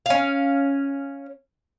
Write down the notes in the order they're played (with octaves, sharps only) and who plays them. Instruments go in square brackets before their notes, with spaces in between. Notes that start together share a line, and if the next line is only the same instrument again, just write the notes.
[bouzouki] C#4 F5